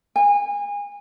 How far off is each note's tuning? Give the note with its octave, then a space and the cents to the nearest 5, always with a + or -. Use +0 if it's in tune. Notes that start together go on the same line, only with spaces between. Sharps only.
G#5 -30